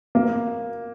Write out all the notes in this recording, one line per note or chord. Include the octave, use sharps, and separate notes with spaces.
A#3